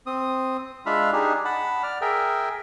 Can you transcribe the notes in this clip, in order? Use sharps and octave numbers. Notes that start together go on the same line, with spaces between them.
C4 D#6
G#3 D4 F4 E5 F5 B5
D4 D#4 G4 G#4
F#5 A5 B5
D5 F6
G#4 A#4 E5 G5